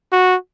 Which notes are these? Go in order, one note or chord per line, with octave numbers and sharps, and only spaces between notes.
F#4